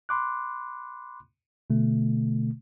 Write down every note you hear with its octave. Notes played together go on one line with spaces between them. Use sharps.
B5 C6 D6 F#6
B2 D3 A3